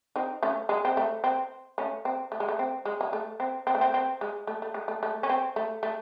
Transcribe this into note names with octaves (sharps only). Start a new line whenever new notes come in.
C4 D#4
A3 C#4
G#3
C4
A3
C4
A3 C#4
C4
A3
G#3
A3
C4
G#3
G#3
A3
C4
C4
A3
C4
C4
G#3
A3
A3
G#3
A3
A3
C#4
C4
A3
A3